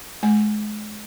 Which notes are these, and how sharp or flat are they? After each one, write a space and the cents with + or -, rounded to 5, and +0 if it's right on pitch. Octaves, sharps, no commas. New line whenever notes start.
G#3 +35 G#5 -5